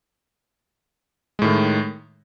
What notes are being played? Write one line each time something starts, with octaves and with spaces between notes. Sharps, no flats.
A2 D#3 G#3